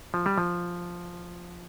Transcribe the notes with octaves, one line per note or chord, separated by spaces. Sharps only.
F3
G3
F3